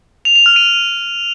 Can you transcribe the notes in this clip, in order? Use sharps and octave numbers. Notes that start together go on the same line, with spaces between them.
F7
F7
F6
D#7